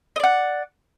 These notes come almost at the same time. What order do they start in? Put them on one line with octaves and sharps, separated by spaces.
D#5 D5 F#5